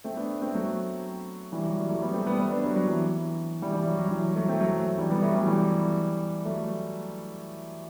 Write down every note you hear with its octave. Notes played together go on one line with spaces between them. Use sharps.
A3 C4
B3 D4
A3 C4
F#3 A3
E3 G3
F#3
E3 G3
F#3 A3
G3 B3
A3 C4
G3 B3
G3 B3
B3 D4
F#3
F#3
E3
E3 G3
E3 G3
F#3
F#3
E3
F#3
F#3 A3
A3 C4
F#3 A3
F#3
E3 G3
G3 B3
F#3 A3
E3 G3
E3 G3
F#3 A3